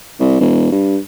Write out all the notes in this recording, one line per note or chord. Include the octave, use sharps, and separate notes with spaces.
C2
E1
G2